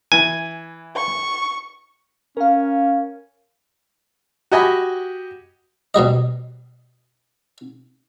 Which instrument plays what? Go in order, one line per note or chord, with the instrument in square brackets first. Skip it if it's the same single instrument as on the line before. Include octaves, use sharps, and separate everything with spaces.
[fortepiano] E3 [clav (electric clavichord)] G#5
[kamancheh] C#6
[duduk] C#4 [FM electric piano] A#4 F5
[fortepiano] F#4 G4 D#5 G#5 B5
[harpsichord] B2 F#3 G3 D#5